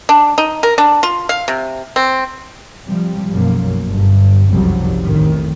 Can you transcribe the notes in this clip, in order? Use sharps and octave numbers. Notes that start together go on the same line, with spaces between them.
D4
D#4
A#4
D4
F4
F5
C3
C4
C3 F3 G3
B1 F#2 F3 A#3
G1 G2
F#1 C2 F2 C3 F#3 G3
A1 F2 A2 D#3